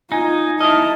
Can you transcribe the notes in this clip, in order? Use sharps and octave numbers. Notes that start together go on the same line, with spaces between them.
D#4 F4 G#5
E4 D#5 A5 F6